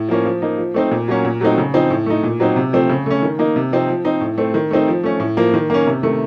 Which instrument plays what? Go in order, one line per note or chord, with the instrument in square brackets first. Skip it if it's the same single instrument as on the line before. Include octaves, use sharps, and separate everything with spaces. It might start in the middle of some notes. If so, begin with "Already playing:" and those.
Already playing: [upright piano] A2
F3 A#3 C#4
F3
A#3 D#4
F3
A3 C4 D#4
A#2
F#3 A#3 C#4
A#2
F#3 A3 C4 D#4
C#3
F3 C4 D#4
A2
A3 D#4
A#2
F#3 C4 D#4
C3
F3 A3 C4
C#3
A3 C#4
D#3
A#3 D#4
C3
F3 C4 D#4
F3
C4 D#4
A2
A3 C4
D#3
A3 C4 D#4
F3
A3 C#4
A2
F3 A#3
D#3
A#3 C#4
C3
D#3 A3